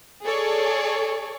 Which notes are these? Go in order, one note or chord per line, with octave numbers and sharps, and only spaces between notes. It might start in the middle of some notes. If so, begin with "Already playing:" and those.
G#4 A4 C#5 D5